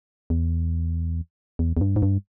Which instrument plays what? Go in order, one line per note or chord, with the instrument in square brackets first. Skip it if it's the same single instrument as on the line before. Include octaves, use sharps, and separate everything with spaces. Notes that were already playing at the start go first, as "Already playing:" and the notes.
[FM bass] E2
E2
E2
G2
G#2
G2